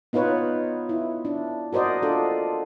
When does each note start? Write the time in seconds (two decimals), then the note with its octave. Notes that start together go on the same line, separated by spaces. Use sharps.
0.13 B3 D#4 F4 B4 C#5
0.89 E4
1.25 D4
1.73 F#4 A#4 C5 D5 D#5
2.02 D4 F4 A4